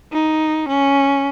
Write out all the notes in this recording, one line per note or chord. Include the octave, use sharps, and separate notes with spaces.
D#4
C#4